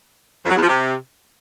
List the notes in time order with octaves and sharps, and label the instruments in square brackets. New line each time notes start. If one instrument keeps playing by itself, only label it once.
[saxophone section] F2
F#3
E2
F3
C3